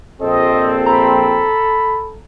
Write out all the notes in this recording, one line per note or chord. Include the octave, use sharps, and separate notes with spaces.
A#1 C4 A4 D#5
A#5 B5